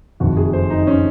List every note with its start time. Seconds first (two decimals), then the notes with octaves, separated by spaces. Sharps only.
0.20 F#1 F2 D#3 F#4
0.37 G#4
0.53 C5
0.70 D#4
0.87 C#4